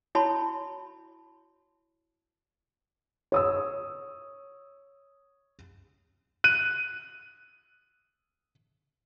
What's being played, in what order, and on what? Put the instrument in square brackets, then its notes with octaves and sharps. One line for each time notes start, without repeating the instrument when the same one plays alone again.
[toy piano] E4 F#4 C#5 A5 B5
[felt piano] C#5 D#6 E6
[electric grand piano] F#6 D#7